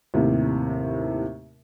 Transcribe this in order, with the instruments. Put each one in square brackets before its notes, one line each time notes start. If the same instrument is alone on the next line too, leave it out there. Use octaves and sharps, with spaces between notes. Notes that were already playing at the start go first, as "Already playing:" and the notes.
[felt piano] D#2 A2 C3